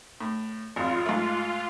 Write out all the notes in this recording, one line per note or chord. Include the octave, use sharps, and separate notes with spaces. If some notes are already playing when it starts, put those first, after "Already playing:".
A2
G#1 F2 F4
G#2 A3